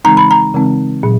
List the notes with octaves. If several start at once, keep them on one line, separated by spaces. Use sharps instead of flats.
C#3 E3 G#3 C4 D#4 A#5
B5
A#5
C#3 E3 G#3 C4 D#4
A#2 F#3